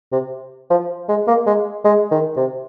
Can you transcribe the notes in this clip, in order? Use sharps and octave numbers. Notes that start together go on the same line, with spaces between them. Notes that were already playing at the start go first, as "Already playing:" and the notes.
C3
F3
G#3
A#3
G#3
G#3
D#3
C3